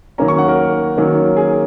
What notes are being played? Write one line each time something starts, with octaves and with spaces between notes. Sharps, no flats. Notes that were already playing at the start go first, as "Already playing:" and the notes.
D#3 F#3 A#3 C#4 A#5
C#6
F#5
A#4
D#3 F#3 A#3 C#4
G#4